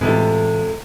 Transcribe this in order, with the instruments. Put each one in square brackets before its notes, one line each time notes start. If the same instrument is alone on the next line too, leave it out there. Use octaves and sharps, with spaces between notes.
[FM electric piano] A2 E3 [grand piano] C3 G#3 [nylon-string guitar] B3 F4 A4